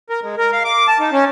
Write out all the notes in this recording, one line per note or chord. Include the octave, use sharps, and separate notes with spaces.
A#4
G#3
A#4
F5
D6
A5
D#4
C#4